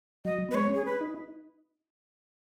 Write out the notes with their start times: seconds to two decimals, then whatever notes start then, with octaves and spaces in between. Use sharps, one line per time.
0.25 F#3 D#5
0.49 B3 B4
0.54 G#3 C#5
0.69 C#4 G#4
0.86 B4
1.01 D#4